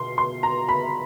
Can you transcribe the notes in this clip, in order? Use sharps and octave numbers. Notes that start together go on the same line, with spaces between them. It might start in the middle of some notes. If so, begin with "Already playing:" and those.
Already playing: B2 C6
C6
A#5
B5